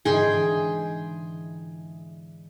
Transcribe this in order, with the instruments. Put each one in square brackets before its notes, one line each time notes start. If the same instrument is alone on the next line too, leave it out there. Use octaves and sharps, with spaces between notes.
[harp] G#2 D3 E3 [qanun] G#4 G5 C6